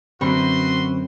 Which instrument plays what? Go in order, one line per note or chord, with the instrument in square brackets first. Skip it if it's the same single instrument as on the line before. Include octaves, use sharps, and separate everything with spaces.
[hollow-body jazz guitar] F#2 [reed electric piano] D3 B5 [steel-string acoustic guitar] C4 [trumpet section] F#4 B4 C6